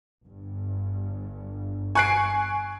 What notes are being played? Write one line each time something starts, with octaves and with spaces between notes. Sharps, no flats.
G1 G2
G#5 C#6 F#6 C7 D7